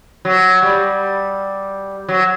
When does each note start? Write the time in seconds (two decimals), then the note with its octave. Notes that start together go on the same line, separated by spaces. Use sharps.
0.25 F#3
0.62 G3
2.09 F#3